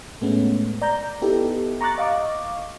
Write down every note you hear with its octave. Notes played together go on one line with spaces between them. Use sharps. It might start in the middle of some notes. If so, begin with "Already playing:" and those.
A2 G#3 A3 B3 C#4
D5 A#5 G6
B3 D#4 E4 G4 A4
A#5 C#6 D6 F#6 A6
D#5 F5 C#6 D6